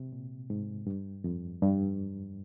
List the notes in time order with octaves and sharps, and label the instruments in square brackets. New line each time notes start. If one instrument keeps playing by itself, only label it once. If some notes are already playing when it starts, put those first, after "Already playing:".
Already playing: [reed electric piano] C3
A#2
G#2
G2
F2
G2